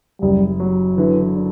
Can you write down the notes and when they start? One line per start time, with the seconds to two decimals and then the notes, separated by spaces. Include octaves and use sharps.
0.21 F#1 G3
0.60 F#3
0.97 D3 E3
1.36 D4